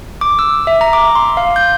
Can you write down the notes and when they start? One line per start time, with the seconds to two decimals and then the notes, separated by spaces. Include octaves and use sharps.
0.21 D6
0.39 E6
0.67 E5
0.81 A#5
0.93 D6
1.15 C6
1.37 F5
1.56 G6